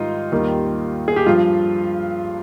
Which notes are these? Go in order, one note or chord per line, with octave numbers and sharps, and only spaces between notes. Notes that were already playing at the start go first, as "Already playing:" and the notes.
Already playing: G#2 D#3 G3 D#4 F4
D#2 D#3 G3
G#4
G4
G2 F3 F4